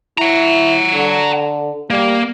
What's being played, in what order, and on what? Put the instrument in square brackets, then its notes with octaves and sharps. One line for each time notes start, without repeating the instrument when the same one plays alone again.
[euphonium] E4 [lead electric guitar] F#5 A#5
[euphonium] D3
[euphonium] G3 [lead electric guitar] A#3